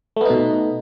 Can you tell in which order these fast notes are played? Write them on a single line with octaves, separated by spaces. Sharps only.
A3 B3 D#4 B2